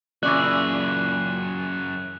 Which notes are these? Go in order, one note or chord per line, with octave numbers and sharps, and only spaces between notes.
F#2 A#2 E3 C#4 G#4 D5 F#6